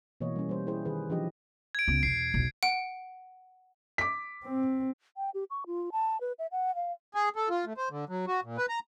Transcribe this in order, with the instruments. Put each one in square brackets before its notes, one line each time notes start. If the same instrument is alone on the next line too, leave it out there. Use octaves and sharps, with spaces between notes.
[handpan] B2 E3 A#3 C#5 D#5
G3 C#4
G3 C5
E4 G4 G#4 C5
D#3 G#4 B4
E3 F3 D4 G4 D#5
[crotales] G#6 D7
[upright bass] C#2 B3
[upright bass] E2 B2 [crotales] C7
[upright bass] B1 E2
[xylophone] F#5 D7
[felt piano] D6 B6
[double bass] C4
[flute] G5
G4
C#6
F4
A5
B4
E5
F#5
F5
[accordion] G#4
A4
F4
A3
C5
D3
F#3
F#4
A#2
B4
A#5